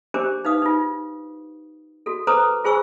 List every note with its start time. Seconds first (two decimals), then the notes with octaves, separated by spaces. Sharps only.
0.14 D4 G4 A#4 C5 D6
0.45 D#4 B4 F5 D#6
0.62 D#4 F4
2.06 F#4 A4
2.27 A4 B4 C5 A#5 D6 D#6
2.64 F4 G#4 C5 G#5 C#6 E6